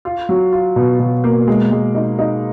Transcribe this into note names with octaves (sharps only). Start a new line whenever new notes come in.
F4
F#3
F4
B2
B2
A#3
G#3
G#3
D#4
D#4